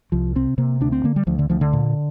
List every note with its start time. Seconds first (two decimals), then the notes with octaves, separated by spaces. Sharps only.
0.12 C2 F3
0.36 C3 C4
0.58 C3 A#3
0.81 D2 D4
0.92 C4
1.04 D3 A#3
1.16 G3
1.27 D2 F3
1.39 D3
1.50 D2 F3
1.61 D3
1.73 A#2